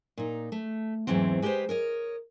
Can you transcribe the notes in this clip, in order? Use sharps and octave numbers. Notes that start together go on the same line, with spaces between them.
A#2 D#4
A3
E2 G#2 E3 F#3 C4
G#3 G4 A4 B4 C5
A#4 C#5 D#5